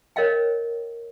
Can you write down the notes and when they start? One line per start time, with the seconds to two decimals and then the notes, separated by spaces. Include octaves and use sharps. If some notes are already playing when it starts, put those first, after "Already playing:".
0.16 A#4 C#5 D#5 F5 G5